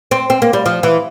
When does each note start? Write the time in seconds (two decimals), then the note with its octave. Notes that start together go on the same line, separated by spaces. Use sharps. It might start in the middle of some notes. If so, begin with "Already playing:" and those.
0.11 C4
0.30 C4
0.42 A#3
0.53 G3
0.66 F3
0.83 E3